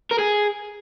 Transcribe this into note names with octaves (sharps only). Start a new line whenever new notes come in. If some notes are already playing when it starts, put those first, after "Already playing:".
A#4
G#4